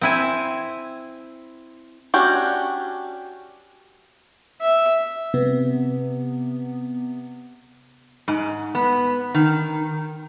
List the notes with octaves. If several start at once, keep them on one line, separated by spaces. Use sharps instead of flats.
C4 E4 G#5
C#4 D4 F#4 G4
E5
C3 B3
G#2
B3
D#3